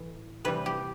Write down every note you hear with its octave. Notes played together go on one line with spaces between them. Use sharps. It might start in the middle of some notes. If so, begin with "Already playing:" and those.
Already playing: A2 E3
C3 E3 G3 B4
G4